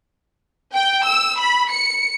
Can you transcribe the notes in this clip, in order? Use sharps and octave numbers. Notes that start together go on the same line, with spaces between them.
G5
E6
B5
C#7